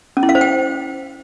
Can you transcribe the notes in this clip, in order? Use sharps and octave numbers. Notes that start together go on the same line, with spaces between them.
C#4
E4
F5
C5
G5